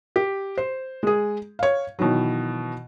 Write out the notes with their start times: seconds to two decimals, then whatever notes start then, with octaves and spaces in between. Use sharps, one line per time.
0.16 G4
0.58 C5
1.03 G#3 G#4
1.59 C#5 F5
1.99 B2 D#3 E3 F#3